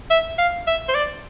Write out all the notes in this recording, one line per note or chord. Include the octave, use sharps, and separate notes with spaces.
E5
F5
E5
C5
D5